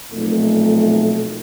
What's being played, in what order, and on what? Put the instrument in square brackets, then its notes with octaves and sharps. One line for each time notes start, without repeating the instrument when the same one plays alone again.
[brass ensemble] B1 F2 A#2 A3